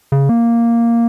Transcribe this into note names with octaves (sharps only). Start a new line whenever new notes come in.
C#3
A#3